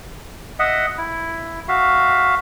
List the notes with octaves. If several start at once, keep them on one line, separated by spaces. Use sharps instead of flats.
D#5 E5 F#5
E4
F#4 E5 F5